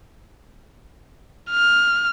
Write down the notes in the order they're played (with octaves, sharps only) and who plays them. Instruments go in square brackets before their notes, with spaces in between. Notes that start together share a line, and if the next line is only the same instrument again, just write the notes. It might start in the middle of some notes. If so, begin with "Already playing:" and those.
[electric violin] F6